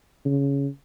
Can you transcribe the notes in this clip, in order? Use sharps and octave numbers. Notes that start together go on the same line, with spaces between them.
C#3